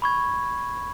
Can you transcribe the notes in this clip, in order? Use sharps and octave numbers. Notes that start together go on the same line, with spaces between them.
B5 C#6 G#6